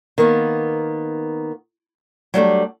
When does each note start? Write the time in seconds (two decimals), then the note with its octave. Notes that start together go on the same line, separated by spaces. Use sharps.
0.18 D#3 A#3 B3
2.34 F#3 G3 A3 D4